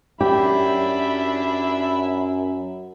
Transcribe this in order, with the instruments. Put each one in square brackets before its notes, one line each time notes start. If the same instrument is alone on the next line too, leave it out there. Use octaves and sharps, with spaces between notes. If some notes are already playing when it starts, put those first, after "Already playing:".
[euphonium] F#2 [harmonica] D4 E5 B5 [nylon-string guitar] G4